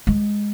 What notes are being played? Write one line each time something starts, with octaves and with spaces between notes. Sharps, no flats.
G#3